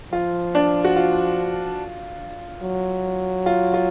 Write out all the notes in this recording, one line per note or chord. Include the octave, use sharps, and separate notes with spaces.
F3 F4
D4
F#4
F4
F#3
F4
F4